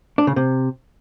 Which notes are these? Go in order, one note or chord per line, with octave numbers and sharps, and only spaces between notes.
D4
C#3
C3